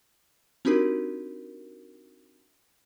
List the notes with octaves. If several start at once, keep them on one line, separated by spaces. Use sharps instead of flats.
C4 D4 D#4 F#4 G4 A#4